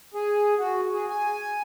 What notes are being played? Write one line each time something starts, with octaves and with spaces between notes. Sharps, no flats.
G#4
F#4
G#4
G#5